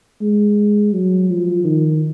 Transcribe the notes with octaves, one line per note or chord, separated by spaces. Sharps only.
G#3
F#3
F3
D#3